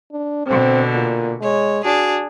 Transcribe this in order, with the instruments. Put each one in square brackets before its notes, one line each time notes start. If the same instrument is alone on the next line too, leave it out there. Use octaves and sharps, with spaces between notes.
[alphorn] D4
[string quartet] B2 D3 [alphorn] C4
[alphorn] A#2
[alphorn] G#3 [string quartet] C#5
[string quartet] D4 G#4 [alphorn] F#4